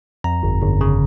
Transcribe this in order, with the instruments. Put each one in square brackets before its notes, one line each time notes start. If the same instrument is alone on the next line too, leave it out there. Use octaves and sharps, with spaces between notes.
[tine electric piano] F2 A#5
G1
G1
C#3